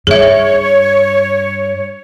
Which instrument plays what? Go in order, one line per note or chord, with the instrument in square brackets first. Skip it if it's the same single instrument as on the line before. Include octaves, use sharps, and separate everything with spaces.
[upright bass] G2 [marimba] G#4 E5 [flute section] C#5